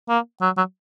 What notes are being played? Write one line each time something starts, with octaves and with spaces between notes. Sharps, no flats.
A#3
F#3
F#3